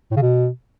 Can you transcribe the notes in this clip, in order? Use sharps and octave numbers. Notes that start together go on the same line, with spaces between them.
A2
C#3
B2